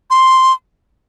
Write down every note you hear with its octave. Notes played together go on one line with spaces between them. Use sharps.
C6